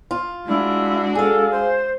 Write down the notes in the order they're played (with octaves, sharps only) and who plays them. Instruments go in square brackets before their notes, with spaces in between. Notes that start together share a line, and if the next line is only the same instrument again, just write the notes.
[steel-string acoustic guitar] F4
[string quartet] G#3 D4 F#4 [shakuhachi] E4
[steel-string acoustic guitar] G#4 F5 [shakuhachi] A4
[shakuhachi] C5